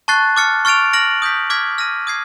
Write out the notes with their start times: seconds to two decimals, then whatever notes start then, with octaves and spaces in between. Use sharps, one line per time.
0.08 A5 C#6 F#6 A6 C7
0.36 D6 F6 A6 C#7
0.65 C#6 F6 A6 D7 F7
0.93 F6 A#6 D7 F#7
1.22 D#6 G6 B6
1.50 D6 F6 G#6 B6
1.78 F6 A#6 D#7
2.07 D#6 G#6 C7